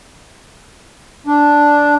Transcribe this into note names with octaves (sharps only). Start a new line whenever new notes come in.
D4